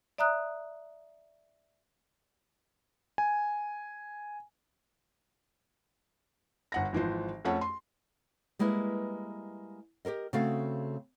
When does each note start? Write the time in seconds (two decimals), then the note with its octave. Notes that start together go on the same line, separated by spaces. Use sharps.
0.18 D5 E5 A#5 D#6 F#6
3.18 G#5
6.72 G1 F#5 A#6
6.93 G#1 E3 F3 C5
7.45 F2 A3 C#4 F#5 A5
7.61 C6
8.59 G3 G#3 A#3 E4 B4
10.05 G4 A4 A#4 D#5
10.33 C#3 A3 C4 F#4 A4 F5